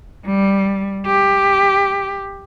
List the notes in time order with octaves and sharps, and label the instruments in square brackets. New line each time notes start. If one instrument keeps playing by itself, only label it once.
[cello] G3
G4